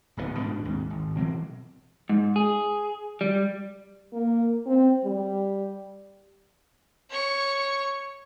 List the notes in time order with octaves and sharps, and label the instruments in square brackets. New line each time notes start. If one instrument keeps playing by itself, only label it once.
[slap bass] D1 B1 C#3 B3
G#2 B2 C4 D4
D#2 G#2 A3 C4
G#1
B2 E3 F#3 C4
[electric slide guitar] G#2
G#4
G3
[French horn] A#3
C4
G3
[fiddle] C#5 C#6